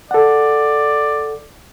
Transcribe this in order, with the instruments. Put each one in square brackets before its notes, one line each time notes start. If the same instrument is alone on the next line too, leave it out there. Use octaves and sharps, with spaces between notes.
[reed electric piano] A4 F#5 [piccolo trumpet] D5